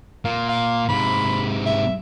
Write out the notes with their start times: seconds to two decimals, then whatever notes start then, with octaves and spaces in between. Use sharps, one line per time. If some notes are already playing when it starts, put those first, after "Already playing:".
0.25 A#2 F5
0.49 F5
0.89 G#2 C3 B5
1.66 E5